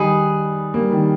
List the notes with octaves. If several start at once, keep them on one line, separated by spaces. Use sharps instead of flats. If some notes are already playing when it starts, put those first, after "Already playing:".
Already playing: D#3 G3 D#4 G#4 B4
G3 A#3
D#3 G3